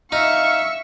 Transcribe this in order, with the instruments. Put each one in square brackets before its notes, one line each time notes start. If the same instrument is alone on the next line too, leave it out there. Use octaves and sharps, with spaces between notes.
[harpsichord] D#4 [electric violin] E5 C#6 [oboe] F5